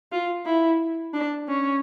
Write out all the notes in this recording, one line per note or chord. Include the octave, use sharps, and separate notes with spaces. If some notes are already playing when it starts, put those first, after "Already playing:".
F4
E4
D4
C#4